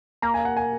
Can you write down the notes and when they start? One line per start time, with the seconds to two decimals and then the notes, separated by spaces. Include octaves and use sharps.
0.22 A#3 A#5
0.34 G#5
0.45 F#5
0.57 G#5